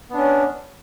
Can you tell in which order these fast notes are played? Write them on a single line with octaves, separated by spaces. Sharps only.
B3 D4 C#4